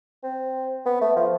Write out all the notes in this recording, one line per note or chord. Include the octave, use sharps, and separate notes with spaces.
C4
B3
A3
F3